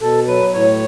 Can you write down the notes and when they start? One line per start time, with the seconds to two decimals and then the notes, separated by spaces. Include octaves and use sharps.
0.01 B2 A4
0.27 F#3 B4
0.53 A2 C#5